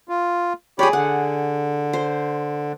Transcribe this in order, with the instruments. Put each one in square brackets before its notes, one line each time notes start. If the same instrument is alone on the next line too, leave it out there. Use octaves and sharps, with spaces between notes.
[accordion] F4
[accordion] G4 C#5 B5 [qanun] G#4 D5
[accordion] D3 [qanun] F#5
[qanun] C5